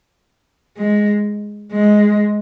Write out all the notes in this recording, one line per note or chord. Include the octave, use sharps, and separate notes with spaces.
G#3
G#3